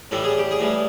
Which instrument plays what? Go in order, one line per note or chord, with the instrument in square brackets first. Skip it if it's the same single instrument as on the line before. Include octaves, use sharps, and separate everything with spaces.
[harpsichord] A2 E3 G3 A4
G#4
G4
G#4
A2 E3 G3